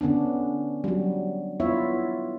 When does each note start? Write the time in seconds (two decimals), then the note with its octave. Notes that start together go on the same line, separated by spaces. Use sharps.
0.01 D3 B3 C#4 D4
0.84 F#3 G3
1.60 B3 E4 F4 C#5 E5